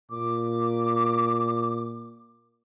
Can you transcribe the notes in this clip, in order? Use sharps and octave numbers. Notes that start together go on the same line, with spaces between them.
A#2 D6